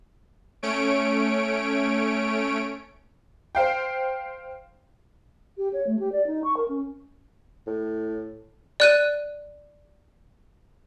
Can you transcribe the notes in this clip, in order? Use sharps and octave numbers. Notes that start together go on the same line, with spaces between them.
A3 C#4 C#5 D7
C5 F5 G5
G4
C#5
A3
G4
D5
D#4
C#6
A#4
C#4
A2
D5 F#6 D#7